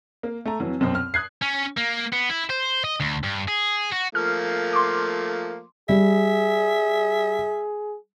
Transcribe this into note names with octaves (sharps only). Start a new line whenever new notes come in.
A#3
A3 A#5
F2 E3 F#3
C2 F#2 B2 C4
F6
D#6 F#6 G#6 C7
C#4
A#3
B3
E4
C5
D#5
D2
G2
G#4
F#4
F3 A3 A#3 F6
C6 D6
G3 G#4 E5